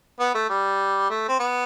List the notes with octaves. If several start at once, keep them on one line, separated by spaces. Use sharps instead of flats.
B3
A3
G3
A3
C4
B3